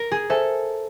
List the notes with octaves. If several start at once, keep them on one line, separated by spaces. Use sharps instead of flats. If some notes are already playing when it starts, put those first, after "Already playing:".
Already playing: A#4
G#4
A4 C5 E5 G#5